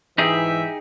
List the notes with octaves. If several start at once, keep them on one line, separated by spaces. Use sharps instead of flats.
G#2 E3 D#4 G4 G#4 E5